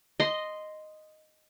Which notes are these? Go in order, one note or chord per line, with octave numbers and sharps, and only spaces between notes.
D#5 C6